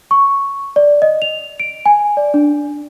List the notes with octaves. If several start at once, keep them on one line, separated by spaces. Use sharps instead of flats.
C#6
D5
D#5
F7
D7
G#5
D5
D4